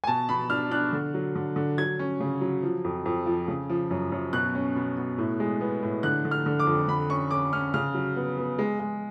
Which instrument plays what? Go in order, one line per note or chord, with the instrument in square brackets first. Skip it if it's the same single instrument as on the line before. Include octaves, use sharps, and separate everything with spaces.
[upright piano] G#5
B2 A5
B2 B5
D4 F6
D4 F#6
D3
F#3
D3
D3
F#3 G#6
C#4
C#3
F#3
F3
F2
F2
F3
C#3
F3
F#2
F#2
B2 F#6
C#4
B2
B2
A2
G#3
B3
A2
D3 F#6
D3
F6
D3
D6
F2
D3 B5
C#4 C#6
C#4 D6
C#4 F6
C#3 F6
F#3
B3
B3
G#3
G#3